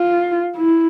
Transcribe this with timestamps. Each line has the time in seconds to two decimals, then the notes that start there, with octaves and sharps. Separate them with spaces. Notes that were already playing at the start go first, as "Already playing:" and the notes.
Already playing: F4
0.57 E4